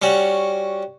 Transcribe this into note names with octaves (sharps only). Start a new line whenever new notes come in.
G3 C#4 F#4